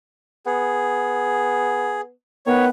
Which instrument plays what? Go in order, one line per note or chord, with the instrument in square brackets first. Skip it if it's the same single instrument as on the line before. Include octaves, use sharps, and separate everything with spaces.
[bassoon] B3 [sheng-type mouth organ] G#4
[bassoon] D#3 [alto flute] B3 [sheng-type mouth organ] C#5